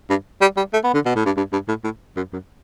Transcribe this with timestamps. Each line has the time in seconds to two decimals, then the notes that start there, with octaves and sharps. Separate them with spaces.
0.10 G2
0.41 G3
0.57 G3
0.73 A3
0.84 B3
0.94 D3
1.06 B2
1.16 A2
1.26 G2
1.37 G2
1.53 G2
1.68 A2
1.84 A2
2.16 F#2
2.33 F#2